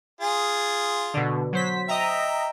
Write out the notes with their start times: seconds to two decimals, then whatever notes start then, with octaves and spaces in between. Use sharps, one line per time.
0.21 F4 G#4
1.14 B2 D3
1.52 F#3 C5 B6
1.89 D#5 E5 G5 A#5